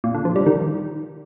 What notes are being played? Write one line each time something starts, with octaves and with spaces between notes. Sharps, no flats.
A#2
D3
F3
G3
D#3